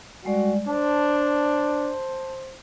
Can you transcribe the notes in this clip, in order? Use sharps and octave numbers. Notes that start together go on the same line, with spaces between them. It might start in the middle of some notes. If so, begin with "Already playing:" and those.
G3 G#3 F#4 D5
D4 C5 A5